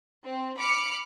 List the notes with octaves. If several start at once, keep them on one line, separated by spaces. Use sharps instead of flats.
C4
B5 D6 F6 C#7